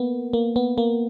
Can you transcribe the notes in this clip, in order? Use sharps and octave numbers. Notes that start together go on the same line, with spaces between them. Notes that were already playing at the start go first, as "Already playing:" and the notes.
Already playing: A#3 B3
A#3
B3
A#3